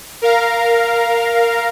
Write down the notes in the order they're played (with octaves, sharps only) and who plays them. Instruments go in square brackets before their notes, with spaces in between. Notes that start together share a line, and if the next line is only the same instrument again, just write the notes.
[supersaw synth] A#4 F5 A#5